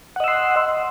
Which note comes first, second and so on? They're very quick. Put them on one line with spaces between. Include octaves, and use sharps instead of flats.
F#5 D#5 E6 C6